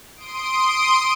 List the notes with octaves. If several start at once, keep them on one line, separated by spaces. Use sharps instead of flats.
C6 D#6 D7